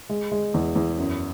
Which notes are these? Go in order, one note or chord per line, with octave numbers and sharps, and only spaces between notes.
G#3
G#3
E2
E2
F#2